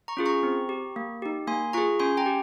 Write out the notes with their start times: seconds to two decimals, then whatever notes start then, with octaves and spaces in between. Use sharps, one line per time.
0.08 A#5 C#6
0.17 C#4 F4 G#4
0.26 A#5 C#6
0.43 C4
0.69 G4
0.96 A#3
1.22 D#4 G4
1.47 A#3 G#5 C6
1.73 F4 G#4 A#5 C#6
2.00 C#4 G#5 C6
2.17 G5 A#5
2.26 G4